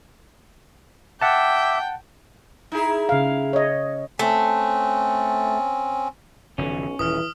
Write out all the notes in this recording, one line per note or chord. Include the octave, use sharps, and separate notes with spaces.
E5 F#5 G5 A5 D6
D#4 E4 G#4
C#3 F5
C#5 D#5
A3 C4 C#4
F1 B1 D3 E3 C#4
D#1 E3 D#6 F6